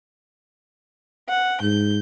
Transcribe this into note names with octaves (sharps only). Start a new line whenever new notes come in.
F#5
G#2 G6